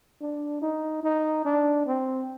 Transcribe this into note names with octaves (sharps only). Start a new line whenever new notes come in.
D4
D#4
D#4
D4
C4